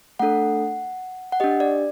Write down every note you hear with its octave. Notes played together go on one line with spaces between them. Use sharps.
A3 D4 A4 F#5
F#5
D4 G4 D#5
D5